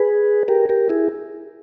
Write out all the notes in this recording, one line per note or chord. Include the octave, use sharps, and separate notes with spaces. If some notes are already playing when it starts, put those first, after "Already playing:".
Already playing: G#4 B4
G4 A#4
G4 A#4
E4 G#4